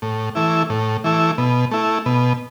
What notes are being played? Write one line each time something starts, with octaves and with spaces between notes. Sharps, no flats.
A2
E3 A3 E4
A2
E3 A3 E4
B2
A3 E4
B2